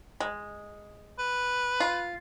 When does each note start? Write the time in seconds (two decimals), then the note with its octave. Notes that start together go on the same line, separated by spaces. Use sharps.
0.20 G#3
1.19 B4
1.80 F4